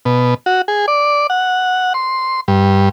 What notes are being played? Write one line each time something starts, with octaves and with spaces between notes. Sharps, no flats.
B2
F#4
G#4
D5
F#5
C6
G2